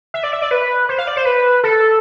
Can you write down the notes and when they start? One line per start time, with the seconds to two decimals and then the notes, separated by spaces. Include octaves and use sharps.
0.14 E5
0.23 D5
0.33 E5
0.42 D5
0.51 B4
0.89 C5
0.99 F5
1.07 D5
1.17 C5
1.26 B4
1.64 A4